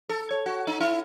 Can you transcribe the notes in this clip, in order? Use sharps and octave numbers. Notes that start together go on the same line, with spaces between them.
A4
C#5
F#4
D#4
E4